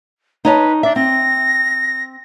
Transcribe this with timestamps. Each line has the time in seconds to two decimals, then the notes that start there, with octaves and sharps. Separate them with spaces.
0.45 D#4 B4 C#5 A5
0.83 D4 E5
0.96 C4 A#6